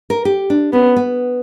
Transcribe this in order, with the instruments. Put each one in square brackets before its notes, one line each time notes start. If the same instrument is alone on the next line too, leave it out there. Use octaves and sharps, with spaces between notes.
[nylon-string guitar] A#4
G4
D4
[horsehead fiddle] B3 [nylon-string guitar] C#4
[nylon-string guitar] B3